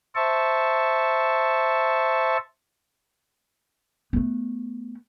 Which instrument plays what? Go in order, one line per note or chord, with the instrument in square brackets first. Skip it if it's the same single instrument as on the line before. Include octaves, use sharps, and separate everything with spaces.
[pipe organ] C5 E5 A5 C#6
[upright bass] A3 B3